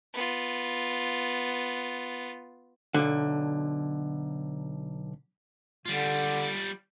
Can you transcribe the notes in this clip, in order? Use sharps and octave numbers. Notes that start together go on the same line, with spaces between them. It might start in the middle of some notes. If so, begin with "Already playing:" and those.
B3 F4
B1 D3
D3 G3 F4